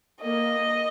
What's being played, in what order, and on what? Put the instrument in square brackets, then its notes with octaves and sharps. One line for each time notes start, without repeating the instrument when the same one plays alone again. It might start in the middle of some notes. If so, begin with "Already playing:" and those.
[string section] A#3 [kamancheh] D#5